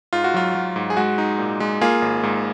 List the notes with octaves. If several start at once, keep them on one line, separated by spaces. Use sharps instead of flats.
G#2 F4
F#4
F#3 F4
F#3
G#2
G#4
G#3 F#4
D#4
A#2
G#3
A#3 F4 G#4
G#1
G#2